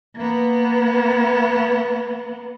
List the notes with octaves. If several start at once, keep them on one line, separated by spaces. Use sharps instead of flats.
A#3 B3